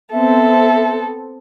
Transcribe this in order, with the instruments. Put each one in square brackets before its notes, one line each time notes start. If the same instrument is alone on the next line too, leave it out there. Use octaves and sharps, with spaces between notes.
[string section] B3 C4 [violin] A4 [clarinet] E5